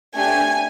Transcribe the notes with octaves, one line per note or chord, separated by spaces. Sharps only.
A3 D4 G4 G#5